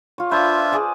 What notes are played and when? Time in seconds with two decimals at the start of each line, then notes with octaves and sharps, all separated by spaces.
0.18 F4 C#5
0.31 D4 F4 B4 C5 E5
0.72 G#4 D5 A5